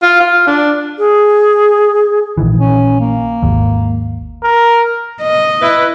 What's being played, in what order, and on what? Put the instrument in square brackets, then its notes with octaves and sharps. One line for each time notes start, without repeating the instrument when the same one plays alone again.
[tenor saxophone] F4
F4
D4
[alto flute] G#4
[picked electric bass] A#1 D#3 E3
[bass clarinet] C#4
A#3
[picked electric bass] G#1 D#2
[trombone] A#4
[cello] D#5
[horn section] E4 B4